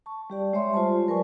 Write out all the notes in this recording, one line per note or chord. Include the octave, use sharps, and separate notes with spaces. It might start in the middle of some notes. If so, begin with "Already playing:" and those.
A5 C#6
G3 G4 D5
G#3 C#5 E5 C6
F4 C5 A5
F#3 A#4 B4 D5 G#5 C#6